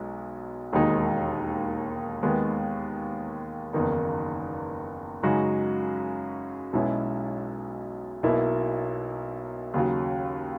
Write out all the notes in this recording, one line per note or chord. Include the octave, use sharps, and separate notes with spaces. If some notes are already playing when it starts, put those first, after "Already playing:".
Already playing: B1 B2 G#3
E1 D#2 D#3 G#3 D#4
D#2 D#3 G#3 B3
F#1 E2 D#3 A#3 D#4
F#2 C#3 G#3 D#4 F#4
B1 B2 G#3 C#4 E4
B1 B2 A#3 E4
D#2 C#3 F#3